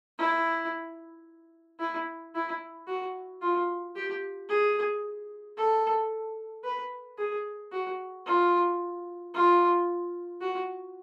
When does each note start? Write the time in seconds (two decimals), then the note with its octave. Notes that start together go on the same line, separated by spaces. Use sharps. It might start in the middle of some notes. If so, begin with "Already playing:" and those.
0.18 E4
1.80 E4
2.35 E4
2.87 F#4
3.41 F4
3.96 G4
4.49 G#4
5.57 A4
6.64 B4
7.18 G#4
7.72 F#4
8.26 F4
9.34 F4
10.41 F#4